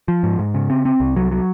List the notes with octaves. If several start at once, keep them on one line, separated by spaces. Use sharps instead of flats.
F3
G#2
G#2
C#3
C4
C4
C2
F#3
F#3